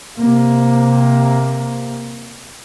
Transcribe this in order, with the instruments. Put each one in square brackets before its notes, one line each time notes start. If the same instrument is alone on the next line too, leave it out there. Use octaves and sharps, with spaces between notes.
[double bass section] C3 A#3